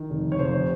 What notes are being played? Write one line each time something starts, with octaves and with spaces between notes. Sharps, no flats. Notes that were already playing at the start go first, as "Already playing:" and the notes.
Already playing: D#3
F1
C#5
F1 C5